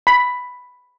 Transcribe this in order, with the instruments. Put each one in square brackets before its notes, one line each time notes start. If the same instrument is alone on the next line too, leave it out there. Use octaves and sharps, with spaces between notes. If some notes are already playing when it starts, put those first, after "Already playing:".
[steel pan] B5